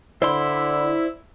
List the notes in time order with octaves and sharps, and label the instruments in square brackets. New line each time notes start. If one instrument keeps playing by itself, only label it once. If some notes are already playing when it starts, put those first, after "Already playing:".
[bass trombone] D3 [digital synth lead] E4 [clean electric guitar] C5 D5 C6 [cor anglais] E5